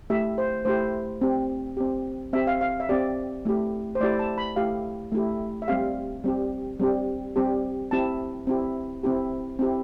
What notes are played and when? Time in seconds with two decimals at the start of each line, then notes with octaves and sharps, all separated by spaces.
0.10 A3 E4 G4 E5
0.38 C5
0.65 A3 E4 G4 C5
1.21 C4 G4
1.77 C4 G4
2.33 C4 G4 E5
2.47 F5
2.61 F5
2.80 E5
2.89 C4 G4 D5
3.45 A3 E4 G4
3.95 C5
4.01 A3 E4 G4 D5
4.19 A5
4.38 B5
4.56 A3 E4 G4 F5
5.12 A3 E4 G4
5.62 E5
5.68 G3 C4 G4 F5
6.24 G3 C4 G4
6.80 G3 C4 G4
7.36 G3 C4 G4
7.91 C4 E4 G4 A5
8.47 C4 E4 G4
9.03 C4 E4 G4
9.59 C4 E4 G4